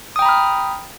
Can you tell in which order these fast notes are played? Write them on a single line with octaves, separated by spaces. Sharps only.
D#6 G5 A#5 B5 F6